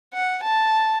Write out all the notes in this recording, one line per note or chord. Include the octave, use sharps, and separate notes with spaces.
F#5
A5